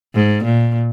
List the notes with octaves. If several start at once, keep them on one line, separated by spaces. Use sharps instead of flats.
G#2
A#2